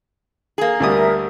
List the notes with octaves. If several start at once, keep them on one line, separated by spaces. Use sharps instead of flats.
A#3 G#4
D2 G3 A#4 E5 D#6